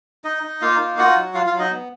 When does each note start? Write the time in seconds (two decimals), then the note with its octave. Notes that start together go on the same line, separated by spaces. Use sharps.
0.24 D#4 D#5
0.43 D#4
0.62 A#3 F4 F5
0.79 D#4
0.98 F4 F#4 F#5
1.17 F#3
1.34 F4 F5
1.46 F4 F5
1.53 F#3
1.59 D#4 D#5
1.71 B3